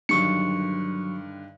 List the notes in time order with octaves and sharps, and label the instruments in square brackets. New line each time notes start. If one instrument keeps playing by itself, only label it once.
[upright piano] G2 D3 D#3 [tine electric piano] F#3 C#6 C#7